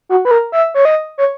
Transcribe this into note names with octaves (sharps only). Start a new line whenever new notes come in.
F#4
B4
A#4
E5
C#5
D#5
C#5